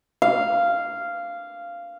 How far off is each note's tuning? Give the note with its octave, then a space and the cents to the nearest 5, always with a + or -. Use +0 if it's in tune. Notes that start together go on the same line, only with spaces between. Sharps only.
F5 -10